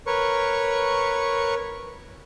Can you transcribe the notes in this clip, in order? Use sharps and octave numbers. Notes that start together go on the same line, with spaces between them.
A#4 B4 C#5 C#6